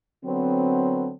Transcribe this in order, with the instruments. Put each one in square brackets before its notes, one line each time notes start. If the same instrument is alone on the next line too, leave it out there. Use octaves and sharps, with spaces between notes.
[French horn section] D3 F#3 B3 C4